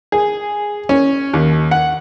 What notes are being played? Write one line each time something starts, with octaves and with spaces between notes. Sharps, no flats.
G#4
C#4
D#2
F#5